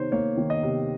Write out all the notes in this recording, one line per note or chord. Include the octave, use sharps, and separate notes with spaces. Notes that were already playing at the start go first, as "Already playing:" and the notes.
Already playing: C3 D#3 D#4 C5 C#5
A#3 C#5
D#3
D#5
C3